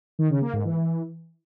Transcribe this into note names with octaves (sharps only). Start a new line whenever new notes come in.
D#3
C#3
A#3
G#2
E3